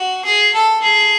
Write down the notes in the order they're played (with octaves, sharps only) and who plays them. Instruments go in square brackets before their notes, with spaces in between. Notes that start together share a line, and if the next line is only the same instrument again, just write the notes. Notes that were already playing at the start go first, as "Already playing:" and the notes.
Already playing: [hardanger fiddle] F#4
G#4
A4
G#4